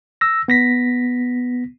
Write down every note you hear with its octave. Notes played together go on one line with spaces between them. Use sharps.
E6 A#6
B3 A#6 B6